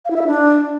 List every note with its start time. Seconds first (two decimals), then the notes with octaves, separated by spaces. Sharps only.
0.05 F5
0.11 E4
0.16 E5
0.21 E4
0.27 D4